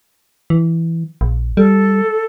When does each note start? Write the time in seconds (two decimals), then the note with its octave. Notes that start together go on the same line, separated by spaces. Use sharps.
0.50 E3
1.21 A#1
1.57 G3 A4